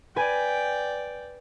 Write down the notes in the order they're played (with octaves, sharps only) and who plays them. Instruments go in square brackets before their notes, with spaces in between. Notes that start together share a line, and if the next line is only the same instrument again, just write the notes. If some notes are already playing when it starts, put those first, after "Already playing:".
[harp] B4 G#5 [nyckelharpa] D5 G5